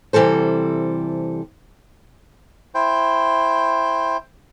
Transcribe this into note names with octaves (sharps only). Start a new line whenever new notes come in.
C3 E3 G3 A4 C5
E4 C5 G5